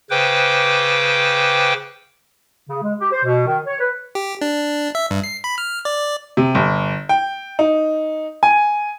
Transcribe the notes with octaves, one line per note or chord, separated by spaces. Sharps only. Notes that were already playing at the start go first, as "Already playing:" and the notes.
C#3 B4 C5 G5 D6
C#3
G#3
G4
C5
B2
D#3
C#5
B4
G4
D4
E5
G2
C7
B5
F6
D5
C3
G1
G5
D#4
G#5